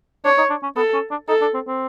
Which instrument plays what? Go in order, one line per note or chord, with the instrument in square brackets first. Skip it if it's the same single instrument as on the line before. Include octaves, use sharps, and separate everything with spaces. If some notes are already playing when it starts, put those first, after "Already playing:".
[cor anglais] D4 [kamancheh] C#5
[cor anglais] D#4
D4
C#4
[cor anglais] B3 [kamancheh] A4
[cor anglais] C#4
D4
[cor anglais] D#4 [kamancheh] A4
[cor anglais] D4
C4
C4